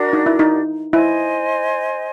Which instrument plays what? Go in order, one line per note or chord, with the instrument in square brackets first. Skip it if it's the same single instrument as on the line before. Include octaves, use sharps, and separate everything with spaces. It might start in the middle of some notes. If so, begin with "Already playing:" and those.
Already playing: [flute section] D4 F#4 A#4 D5
[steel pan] D#4
E4
D#4
[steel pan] E4 [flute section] C5 D#5 G#5